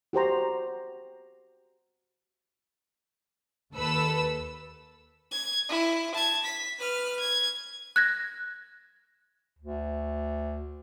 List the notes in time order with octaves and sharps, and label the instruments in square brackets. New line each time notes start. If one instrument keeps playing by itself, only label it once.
[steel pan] F#4 G4 C5 A#5
[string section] D#2 A4 B4 E6
[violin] G#6
E4
A5 G#6
B6
B4 F6
G#6
[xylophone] F#6 G#6 A#6
[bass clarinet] D2